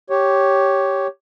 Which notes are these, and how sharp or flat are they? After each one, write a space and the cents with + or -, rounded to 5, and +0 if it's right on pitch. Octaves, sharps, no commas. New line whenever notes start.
G4 -5 C#5 +0